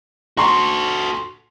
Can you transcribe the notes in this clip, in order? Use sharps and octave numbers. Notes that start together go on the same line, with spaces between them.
F#4 A4 C6 C#6